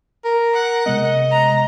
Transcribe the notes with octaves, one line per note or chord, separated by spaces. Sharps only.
A#4
F#5
C3 G#3 B3 D#5
A#5